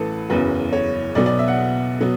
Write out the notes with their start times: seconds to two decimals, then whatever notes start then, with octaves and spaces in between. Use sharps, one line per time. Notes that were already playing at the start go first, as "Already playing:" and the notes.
Already playing: A1 A2 E3 A4 B4
0.30 F#1 E2 C#3 F#3 B4
0.73 C#5
1.15 B1 B2 F#3 B3 D5
1.26 D5
1.39 E5
1.48 F#5
2.00 B2 F#3 B3